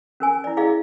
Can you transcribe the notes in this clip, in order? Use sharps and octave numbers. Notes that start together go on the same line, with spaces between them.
C#4 A#4 G#5
E4 D5
E4 G#4 D5 D#5 F5